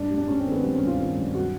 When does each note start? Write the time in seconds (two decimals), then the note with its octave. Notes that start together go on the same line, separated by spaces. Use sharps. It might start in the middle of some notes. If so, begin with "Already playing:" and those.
Already playing: G2 D4
0.10 G3
0.18 D4
0.28 G2 C#4
0.40 C4
0.46 D#3
0.52 B3
0.63 G3 C4
0.75 C#4
0.81 G2
0.87 F4
0.99 D#3
1.17 G2
1.35 F#3 F#4